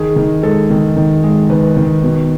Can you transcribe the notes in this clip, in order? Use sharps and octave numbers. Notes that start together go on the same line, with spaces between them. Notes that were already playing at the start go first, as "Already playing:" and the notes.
Already playing: D#3 G#4
D#3
G#3 A4
D#3
D#3
G#3
D#3 B4
D#3
B2